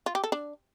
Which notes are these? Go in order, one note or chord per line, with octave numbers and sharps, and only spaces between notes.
F4
G4
A4
D4